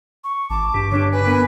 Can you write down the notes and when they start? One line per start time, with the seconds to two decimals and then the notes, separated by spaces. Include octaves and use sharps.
0.24 C#6
0.50 G#1 A5 D6
0.74 G2 G4
0.91 D3 D4 G4 C#5
1.12 B4 G#5
1.25 D3 B3 A#4 G#5